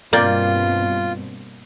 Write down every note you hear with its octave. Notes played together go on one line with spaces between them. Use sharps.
G2 B2 A#3 C4 F4 D5 G5